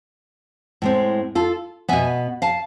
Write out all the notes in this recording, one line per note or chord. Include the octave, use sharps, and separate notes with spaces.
A2 G#3 C4
F4 A4
B2 B3 E5 G#5
F5 A5